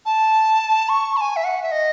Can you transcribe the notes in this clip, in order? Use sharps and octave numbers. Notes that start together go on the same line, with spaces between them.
A5
C#6
A5
G#5
E5
F#5
E5
D#5